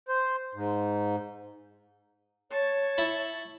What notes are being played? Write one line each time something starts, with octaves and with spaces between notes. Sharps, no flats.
C5
G#2
C#5 A5 C#6
E4